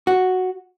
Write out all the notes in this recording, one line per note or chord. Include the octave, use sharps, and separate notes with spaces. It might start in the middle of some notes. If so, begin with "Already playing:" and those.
F#4